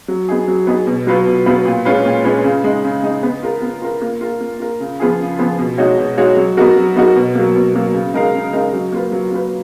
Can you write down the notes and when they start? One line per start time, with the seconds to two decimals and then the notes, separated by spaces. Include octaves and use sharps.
0.08 F#3
0.28 B3 D#4 G#4
0.48 F#3
0.67 B3 D#4 G#4
0.87 B2
1.07 F#3 B3 F4 B4
1.26 B2
1.46 F#3 B3 F4 B4
1.65 A#2
1.85 G#3 C#4 F4 B4
2.05 A#2
2.24 G#3 C#4 F4 B4
2.44 C#3
2.64 G#3 D#4
2.84 C#3
3.03 G#3 D#4
3.23 B3
3.43 F4 A#4
3.62 B3
3.82 F4 A#4
4.02 A#3
4.21 F4 A#4
4.41 A#3
4.60 F4 A#4
4.80 C#3
5.00 F3 B3 F4 G#4
5.20 C#3
5.39 F3 B3 F4 G#4
5.59 B2
5.78 G#3 D#4 F#4 C#5
5.98 B2
6.18 G#3 D#4 F#4 C#5
6.37 F#3
6.57 B3 D#4 F#4 A#4
6.76 F#3
6.96 B3 D#4 F#4 A#4
7.15 B2
7.35 F#3 A#3
7.55 B2
7.75 F#3 A#3
7.94 C#3
8.14 G#3 D#4 A#4 F5
8.34 C#3
8.53 G#3 D#4 A#4 F5
8.73 F#3
8.92 A#3 F4 B4
9.12 F#3
9.31 A#3 F4 B4